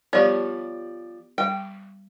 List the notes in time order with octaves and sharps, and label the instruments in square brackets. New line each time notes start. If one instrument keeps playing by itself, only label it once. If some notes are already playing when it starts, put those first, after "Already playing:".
[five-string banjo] F3 G3 C#5 [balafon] B3 G4 D5
[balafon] G3 [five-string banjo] G5